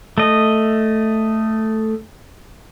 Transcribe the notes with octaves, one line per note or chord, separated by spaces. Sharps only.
A3 D#5